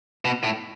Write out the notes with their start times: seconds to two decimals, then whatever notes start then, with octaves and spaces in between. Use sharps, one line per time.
0.25 B2
0.44 A2